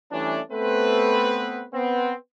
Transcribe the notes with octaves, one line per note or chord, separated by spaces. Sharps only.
E3 G3 A3 C#4 D4
A3 B3 C4 B4
B3 C4